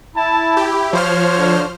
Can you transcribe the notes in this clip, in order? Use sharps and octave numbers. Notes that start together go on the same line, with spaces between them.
E4 A5
G4
F3 F#4 C5 C#5 F6
D3